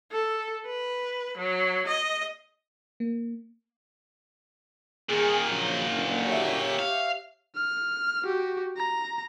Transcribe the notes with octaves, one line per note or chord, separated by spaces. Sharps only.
A4
B4
F#3
D#5
A#3
A#2 D#3 G#4
A#1 C#3 F#3
F#1 D3
G4 C#5 E5
F5
F6
F#4 G4
A#5